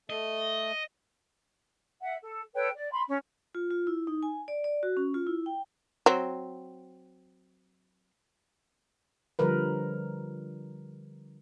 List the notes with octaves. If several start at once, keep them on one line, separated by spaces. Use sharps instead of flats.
A3 D#5
E5 F#5
A4
A4 B4 C#5 G5
D5
B5 C6
C#4
F4
F4
E4
D#4
G#5
D5
D5
F#4
C#4
F4
E4
G5
F#3 C4
D3 F3 G3 A#4 B4